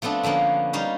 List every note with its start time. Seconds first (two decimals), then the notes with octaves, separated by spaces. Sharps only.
0.02 F3 A3 B3 C4 D4
0.23 D3 F3 A#3 B3 C#4
0.73 G3 C#4 D#4 C#5 F5